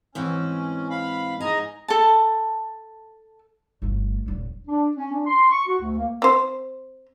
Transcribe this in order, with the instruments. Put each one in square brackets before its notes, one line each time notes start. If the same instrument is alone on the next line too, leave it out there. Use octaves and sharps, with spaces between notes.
[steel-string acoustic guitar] G#2 E3 C4 [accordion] C#4
[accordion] F5 B5
[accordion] G#2 D#5 A#5 [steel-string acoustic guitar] G#5
[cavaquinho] A4 A5
[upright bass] G1 A3
D#1 F#3
[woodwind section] D4
C#4
D4
C6
C#6
F#4
D2
A#3
[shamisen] C4 C5